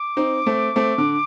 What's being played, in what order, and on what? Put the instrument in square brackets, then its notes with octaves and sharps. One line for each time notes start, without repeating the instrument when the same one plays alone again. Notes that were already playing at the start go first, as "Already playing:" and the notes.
Already playing: [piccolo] D6
[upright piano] C4 D#4
A3 C4
A3 C4
D3